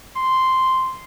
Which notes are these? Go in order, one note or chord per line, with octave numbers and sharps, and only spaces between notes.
C6